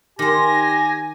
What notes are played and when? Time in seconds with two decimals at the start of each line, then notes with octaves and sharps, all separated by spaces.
0.19 D#3 G4 C5 G#5 A#6